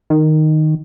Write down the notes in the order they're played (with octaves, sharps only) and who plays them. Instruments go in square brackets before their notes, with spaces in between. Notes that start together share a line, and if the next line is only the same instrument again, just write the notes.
[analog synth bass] D#3